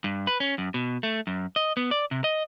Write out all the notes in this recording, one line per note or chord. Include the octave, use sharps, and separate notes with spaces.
G2
B4
C#4
F#2
B2
A3
F#2
D#5
B3
D5
C3
D#5